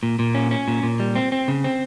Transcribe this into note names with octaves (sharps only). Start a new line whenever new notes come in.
A#2
A#2
C#4
C#4
A#2
A#2
G3
C4
C4
C#3
C4